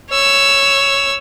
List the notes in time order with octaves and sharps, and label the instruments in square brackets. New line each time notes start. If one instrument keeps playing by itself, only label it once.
[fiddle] C#5 E6